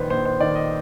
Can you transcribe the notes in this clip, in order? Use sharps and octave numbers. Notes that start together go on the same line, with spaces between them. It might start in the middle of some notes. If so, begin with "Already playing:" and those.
Already playing: A#1 D#3 B4 C5
A#1 C5
C5
D#3 D5
D#5